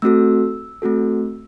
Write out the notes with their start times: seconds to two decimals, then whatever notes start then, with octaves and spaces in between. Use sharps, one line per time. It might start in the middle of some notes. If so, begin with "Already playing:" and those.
0.02 A3 C4 F#4 A4 E6
0.82 A3 C4 F#4 A4